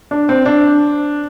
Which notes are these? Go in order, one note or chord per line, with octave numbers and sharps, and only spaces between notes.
D4
C4
D4